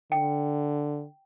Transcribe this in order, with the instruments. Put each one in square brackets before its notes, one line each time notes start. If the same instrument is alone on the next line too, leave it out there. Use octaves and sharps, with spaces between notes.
[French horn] D3 [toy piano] G5